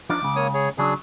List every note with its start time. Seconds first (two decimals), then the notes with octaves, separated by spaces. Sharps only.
0.10 F3 D4 D#4 D6
0.21 C#2 C#3
0.36 A#3 C#5 D#6
0.54 G#4 C#5
0.78 C#3 F#3 D4 G#4